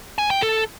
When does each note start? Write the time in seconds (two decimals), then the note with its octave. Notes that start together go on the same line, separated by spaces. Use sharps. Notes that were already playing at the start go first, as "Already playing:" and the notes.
0.18 G#5
0.30 G5
0.42 A4